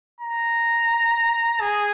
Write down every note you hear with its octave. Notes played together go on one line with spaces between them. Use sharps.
A#5
G#4